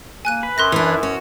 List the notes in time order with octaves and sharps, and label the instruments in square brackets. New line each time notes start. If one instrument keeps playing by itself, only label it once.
[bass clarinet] A#3 [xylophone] G#5 F#6 D#7
[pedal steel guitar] B4
[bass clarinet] F#2 [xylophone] C6 F#6 A#6
[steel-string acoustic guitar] E3 D4 [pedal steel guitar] C#4 E4
[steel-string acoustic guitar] C#4 [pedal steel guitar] F#4